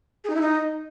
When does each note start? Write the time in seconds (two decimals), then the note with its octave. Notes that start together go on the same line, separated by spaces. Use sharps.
0.24 G#4
0.30 D#4
0.35 E4
0.41 D#4